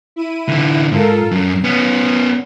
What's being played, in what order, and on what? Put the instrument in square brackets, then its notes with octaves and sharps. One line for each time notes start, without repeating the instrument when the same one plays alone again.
[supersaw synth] E4 D#7
[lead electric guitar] D3 E3
[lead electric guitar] G#2 [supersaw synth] F4 A4 A#4
[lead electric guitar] F#2 [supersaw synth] C7
[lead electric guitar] B3 C#4